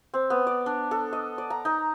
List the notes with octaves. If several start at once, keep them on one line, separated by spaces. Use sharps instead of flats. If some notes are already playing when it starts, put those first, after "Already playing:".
C4
B3
D5
D4
A4
D#5
D5
A#5
D#4